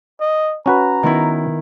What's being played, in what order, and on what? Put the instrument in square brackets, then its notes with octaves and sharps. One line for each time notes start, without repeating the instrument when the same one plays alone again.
[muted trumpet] D#5
[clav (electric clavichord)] C#4 F#4 B4 [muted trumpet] A#5
[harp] D#3 B3 E4